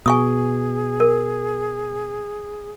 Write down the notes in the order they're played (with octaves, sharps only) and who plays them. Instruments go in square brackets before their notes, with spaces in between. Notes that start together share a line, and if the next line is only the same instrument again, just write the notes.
[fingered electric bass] B2 [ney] G#4 [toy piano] G#5 C#6 D#6
[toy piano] A#4